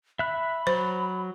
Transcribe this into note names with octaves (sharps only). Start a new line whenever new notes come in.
E5 B5 F#6
F#3 C5